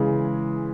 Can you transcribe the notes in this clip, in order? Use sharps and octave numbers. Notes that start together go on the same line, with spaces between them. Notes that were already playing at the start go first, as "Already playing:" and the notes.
Already playing: C#3 E3 G#3